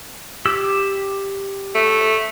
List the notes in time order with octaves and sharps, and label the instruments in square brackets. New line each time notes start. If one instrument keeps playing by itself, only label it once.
[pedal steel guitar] G4 E6
[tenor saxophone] A3